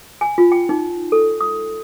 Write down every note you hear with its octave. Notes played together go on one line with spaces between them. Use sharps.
G#5
F4
G5
D#4
A4
D#6